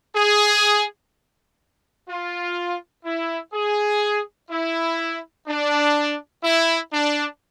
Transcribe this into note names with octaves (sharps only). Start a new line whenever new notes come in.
G#4
F4
E4
G#4
E4
D4
E4
D4